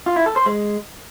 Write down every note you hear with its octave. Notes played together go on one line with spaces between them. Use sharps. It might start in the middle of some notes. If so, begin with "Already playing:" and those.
F4
E4
A4
C5
G#3